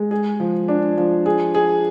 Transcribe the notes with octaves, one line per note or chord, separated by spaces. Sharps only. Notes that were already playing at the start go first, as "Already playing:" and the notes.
Already playing: G#3
G#4
F3
D4
F3
G#4
G#4